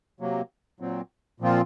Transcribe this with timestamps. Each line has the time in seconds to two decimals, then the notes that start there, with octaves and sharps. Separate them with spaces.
0.20 C3 F#3 A#3
0.80 A#2 F#3 C4
1.40 A#2 F3 C4 F4